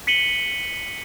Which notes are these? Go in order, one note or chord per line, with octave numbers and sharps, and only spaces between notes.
B6 C#7 D#7 F#7 G7